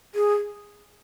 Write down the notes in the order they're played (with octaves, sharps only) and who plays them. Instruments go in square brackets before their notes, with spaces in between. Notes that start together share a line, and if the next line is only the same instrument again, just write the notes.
[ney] G#4